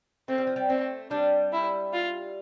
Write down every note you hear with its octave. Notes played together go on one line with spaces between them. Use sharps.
A3 C4
G3
F3
G3
A3 C4
G3 D4
E4
F4